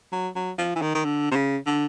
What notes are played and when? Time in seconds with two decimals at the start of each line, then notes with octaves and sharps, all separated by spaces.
0.12 F#3
0.35 F#3
0.58 F3
0.76 E3
0.82 D#3
0.95 D#3
1.05 D3
1.31 C3
1.36 C#3
1.66 D3